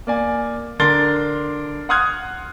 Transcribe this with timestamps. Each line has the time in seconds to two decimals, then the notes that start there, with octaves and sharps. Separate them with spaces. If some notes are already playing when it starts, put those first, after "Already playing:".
0.07 A#3 D5 G#5
0.79 D3 D4 A#4 C6 A6 G7
1.89 F#5 C6 D#6 F6 F#6 G#6